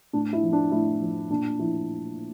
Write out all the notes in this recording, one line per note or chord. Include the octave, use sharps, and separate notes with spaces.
A2 D4
E4
F3
D4
A2 E4
F3
A#2 D4
F3 E4